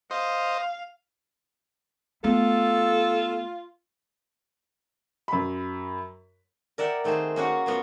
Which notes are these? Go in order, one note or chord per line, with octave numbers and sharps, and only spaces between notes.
C5 D#5 F5
A3 B3 F4 A4
F#2 B5
A#4 D5 E5 F#5 G5
D#3 A3 C4 G#4 C5
A#3 C#4 F#4 F#5
F#2 F#3 B3 F4